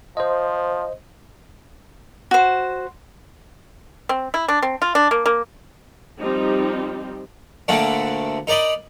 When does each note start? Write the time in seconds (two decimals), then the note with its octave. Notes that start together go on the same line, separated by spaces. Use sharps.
0.17 F3 C5 D#5
2.31 F#4 C5
4.09 C4
4.34 E4
4.48 D4
4.62 C4
4.82 F4
4.95 D4
5.11 A#3
5.26 A#3
6.20 F3 G3 C4 D#4 G4
7.68 D2 A#2 D3 A3 A#3 D4
8.47 D#4 A#4 D5 D#5 B5